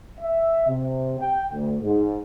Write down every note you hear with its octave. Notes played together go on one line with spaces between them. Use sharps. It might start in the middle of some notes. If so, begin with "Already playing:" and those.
E5
C3
G5
D2
G#2